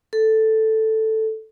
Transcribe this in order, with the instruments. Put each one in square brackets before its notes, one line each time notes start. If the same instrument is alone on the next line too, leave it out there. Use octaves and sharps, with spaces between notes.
[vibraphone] A4